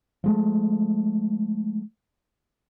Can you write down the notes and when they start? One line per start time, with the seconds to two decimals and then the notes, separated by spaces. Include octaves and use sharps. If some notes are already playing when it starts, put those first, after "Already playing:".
0.24 F3 G#3 A3